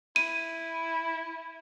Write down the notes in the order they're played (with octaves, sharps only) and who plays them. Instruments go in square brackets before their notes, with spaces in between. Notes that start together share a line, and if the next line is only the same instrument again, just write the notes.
[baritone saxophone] E4 [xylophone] D#7